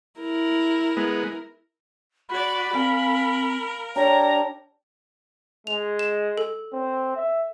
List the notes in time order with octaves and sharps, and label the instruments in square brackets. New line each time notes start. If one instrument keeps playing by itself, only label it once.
[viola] E4 A#4
[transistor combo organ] G#3 B3
[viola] F#4 D5 [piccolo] B5
[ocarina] C4 [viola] A#4 [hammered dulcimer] F5 G#5
[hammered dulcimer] D4 G4 [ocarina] C#5 [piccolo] A#5
[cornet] G#3 [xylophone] F7
[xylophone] E7
A4
[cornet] C4
E5